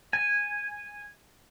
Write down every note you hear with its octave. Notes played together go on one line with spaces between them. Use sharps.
G#5